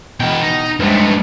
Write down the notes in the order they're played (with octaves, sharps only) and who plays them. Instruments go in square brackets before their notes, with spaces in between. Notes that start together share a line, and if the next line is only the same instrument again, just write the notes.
[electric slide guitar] B2 [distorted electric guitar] E3 G5
[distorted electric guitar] D#4
[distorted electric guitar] G2 A3 [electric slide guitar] G#3 B4 C5